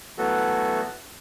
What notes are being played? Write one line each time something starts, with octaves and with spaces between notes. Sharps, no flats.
E3 F#3 A3 B3 F#4 A4